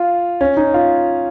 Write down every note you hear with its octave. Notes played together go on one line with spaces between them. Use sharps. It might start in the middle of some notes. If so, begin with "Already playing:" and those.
Already playing: F4
C#4
D#4
F4